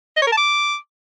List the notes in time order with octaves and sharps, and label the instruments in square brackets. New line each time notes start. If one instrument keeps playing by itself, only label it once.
[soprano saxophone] D#5
C#5
A#4
A5
D6